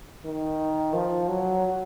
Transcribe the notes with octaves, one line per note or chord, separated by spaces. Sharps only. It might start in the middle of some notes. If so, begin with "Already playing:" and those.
D#3
F3
F#3